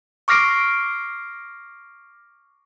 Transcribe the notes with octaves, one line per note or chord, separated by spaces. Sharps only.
C#6 D6 F6 A#6 C7 D7